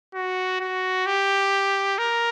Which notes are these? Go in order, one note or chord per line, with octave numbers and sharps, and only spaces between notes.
F#4
F#4
G4
A#4